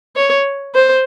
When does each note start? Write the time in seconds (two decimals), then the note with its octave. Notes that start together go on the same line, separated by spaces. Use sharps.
0.16 C#5
0.75 C5